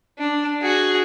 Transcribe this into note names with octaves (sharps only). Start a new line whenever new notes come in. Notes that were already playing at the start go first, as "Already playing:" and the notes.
D4
F#4 G#4